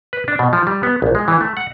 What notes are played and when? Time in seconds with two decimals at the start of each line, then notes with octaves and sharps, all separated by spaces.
0.13 B4
0.28 D4
0.39 B2
0.53 F3
0.67 G3
0.83 B3
1.02 A#1
1.15 G#3
1.28 E3
1.41 A3
1.57 F#5